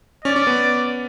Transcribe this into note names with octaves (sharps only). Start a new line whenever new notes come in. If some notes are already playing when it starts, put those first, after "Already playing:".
C#4 D5
C#4
B3